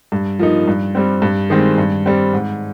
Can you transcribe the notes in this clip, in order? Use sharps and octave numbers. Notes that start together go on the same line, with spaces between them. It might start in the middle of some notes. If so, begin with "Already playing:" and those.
G2
F3 A#3 D#4
G2
G3 C4
G2
D#3 G#3 C4
G2
G3 C4
G#2